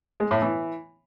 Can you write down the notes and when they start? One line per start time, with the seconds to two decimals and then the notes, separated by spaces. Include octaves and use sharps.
0.20 G#3
0.31 A2
0.42 E3